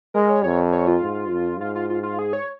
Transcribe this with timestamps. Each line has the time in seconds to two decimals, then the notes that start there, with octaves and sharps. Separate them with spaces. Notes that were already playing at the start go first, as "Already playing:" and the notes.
0.14 G#3 A#4
0.30 C#5
0.44 F2 C#5
0.72 C#5
0.88 F4
1.02 G#2
1.31 F2
1.60 G#2 F4
1.75 F4
1.90 F4
2.03 F4
2.19 G#4
2.33 C#5